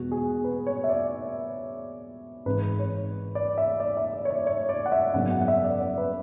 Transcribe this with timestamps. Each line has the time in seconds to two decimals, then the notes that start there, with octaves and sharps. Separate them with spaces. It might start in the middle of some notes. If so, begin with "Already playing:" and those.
Already playing: E2 B2 G#3 B3 F#4
0.12 G#4
0.44 B4
0.67 C#5
0.84 E5
0.90 D5
2.45 G#1 G#2 E3 B4
2.79 C#5
3.35 D5
3.58 E5
3.80 D5
3.97 E5
4.14 D5
4.25 C#5
4.30 D5
4.47 C#5
4.69 D5
4.86 F#5
4.92 E5
5.13 G#1 F#2 C#3 F#3 B3 F#5
5.31 F#5
5.41 F#5
5.48 E5
5.64 D5
5.81 D5
5.98 B4